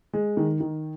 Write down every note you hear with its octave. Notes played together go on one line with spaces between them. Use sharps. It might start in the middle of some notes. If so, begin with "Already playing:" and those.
G#3
D#3
D#3